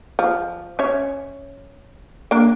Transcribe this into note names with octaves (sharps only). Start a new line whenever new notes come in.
F3
C#4 C#5 E5
A#3 D4